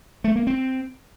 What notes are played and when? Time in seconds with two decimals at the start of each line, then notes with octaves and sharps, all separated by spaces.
0.24 A3
0.36 A#3
0.47 C4